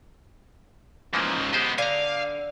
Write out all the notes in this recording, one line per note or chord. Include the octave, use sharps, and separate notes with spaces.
G#2 C#3 E3 F3 A#3
G#3 B3 G4 C5 D#5
D3 F5 G#5 A#5